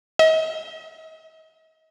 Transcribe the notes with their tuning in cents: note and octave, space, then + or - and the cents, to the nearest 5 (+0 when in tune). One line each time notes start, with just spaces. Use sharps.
D#5 +40